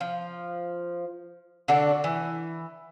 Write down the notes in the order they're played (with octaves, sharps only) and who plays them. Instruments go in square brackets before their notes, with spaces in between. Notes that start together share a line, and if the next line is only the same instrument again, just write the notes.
[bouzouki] F3
D3 D4 F#4 A4
E3